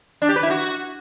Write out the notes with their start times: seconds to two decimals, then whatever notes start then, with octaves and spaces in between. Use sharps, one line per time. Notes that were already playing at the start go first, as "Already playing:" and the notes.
0.22 D4
0.29 G4
0.36 B4
0.43 E4
0.50 F#4